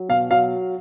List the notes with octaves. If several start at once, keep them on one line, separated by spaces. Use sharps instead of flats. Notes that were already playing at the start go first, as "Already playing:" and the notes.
Already playing: F#3
B2 F5
F#3 F5